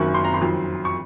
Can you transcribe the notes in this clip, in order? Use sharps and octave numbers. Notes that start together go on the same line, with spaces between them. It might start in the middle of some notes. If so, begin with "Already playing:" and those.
Already playing: F#1 F#2 D#3 F#3 C#6
C6
A#5
C6
F2 D#3 F#3
C#6